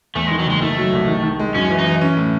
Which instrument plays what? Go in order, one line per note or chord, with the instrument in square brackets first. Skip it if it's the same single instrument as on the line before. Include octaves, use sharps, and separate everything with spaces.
[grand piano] E2 [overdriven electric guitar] A3
[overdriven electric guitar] G#3
[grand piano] D#3
[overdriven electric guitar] F#3
[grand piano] F#1 [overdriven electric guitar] G#3
[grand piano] D#3 [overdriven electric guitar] A3
[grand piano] F#3
C2
D#3
D#3
G#3
[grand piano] F#2 [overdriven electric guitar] C#4
[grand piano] E3
[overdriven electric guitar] D#4
[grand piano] E3
C#4
A2